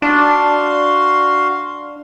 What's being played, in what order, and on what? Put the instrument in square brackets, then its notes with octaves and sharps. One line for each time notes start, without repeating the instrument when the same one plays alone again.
[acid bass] D4 [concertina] F#4 F5 C6